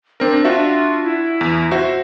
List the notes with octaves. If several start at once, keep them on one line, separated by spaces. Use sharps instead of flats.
C4 D4 A#4
D4 F4 F#4 E5
E4
E2
F#4 C5 E5